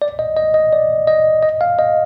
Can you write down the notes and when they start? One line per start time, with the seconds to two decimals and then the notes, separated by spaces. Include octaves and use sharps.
0.02 D5
0.19 D#5
0.37 D#5
0.54 D#5
0.73 D5
1.07 D#5
1.43 D#5
1.61 F5
1.79 D#5